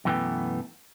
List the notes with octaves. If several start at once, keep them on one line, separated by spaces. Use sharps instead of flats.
F#2 B2 E3 A3 B3 G5